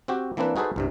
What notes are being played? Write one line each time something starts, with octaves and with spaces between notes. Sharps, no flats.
C4 F#4 G4
E3 A#3 C4 D4 B4
D#4 F#4 G#4 A4 B4 C5
C2 G2 C3